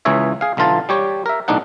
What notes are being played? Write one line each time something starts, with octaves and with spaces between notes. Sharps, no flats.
C#2 E3 G#4 C#5 E5
G#4 F5
B1 D3 E3 F4 A5
G3 G4 C#5
A#4 E5
B1 A2 D4 D#4 F#5